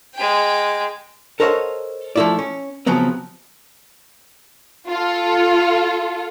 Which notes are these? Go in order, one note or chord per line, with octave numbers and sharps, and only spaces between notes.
G#3 G5
A4 A#4 C5 C#5 D#5 F#5
F3 A3 A#3 E4 F4 D5
C#4
C#3 F3 F#3 B3 C4
F4 A4